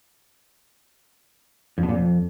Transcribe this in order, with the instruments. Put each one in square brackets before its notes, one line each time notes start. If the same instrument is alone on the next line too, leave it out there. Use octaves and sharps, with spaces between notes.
[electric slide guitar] F2
B2
A#2
F2